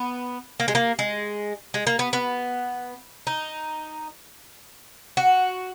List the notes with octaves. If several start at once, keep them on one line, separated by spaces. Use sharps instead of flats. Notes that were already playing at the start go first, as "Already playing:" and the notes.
Already playing: B3
A#3
G#3
A#3
G#3
G#3
A#3
B3
B3
D#4
F#4